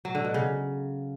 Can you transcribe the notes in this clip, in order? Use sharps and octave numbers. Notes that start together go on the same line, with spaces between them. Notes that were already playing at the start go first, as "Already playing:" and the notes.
F#3
D3
B2
C#3